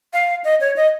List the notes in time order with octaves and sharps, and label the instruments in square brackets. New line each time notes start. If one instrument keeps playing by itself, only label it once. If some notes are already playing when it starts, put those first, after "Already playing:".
[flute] F5
D#5
C#5
D#5